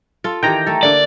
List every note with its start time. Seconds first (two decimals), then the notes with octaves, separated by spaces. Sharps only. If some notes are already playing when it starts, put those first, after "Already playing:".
0.24 F4 A4
0.43 D#3 E3 G4 G5 A#5
0.66 A3 A4
0.83 D3 A#3 D5